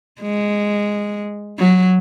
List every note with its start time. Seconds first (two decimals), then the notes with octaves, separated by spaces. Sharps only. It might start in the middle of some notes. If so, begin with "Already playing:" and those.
0.22 G#3
1.59 F#3